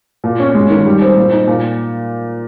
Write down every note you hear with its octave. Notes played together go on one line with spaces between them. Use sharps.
A#2
C#4
G#3
D#3
G3
C4
A#2
D#4
A#2